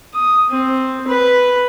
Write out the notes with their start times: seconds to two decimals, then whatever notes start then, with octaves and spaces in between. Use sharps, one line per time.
0.14 D#6
0.50 C4
1.08 B4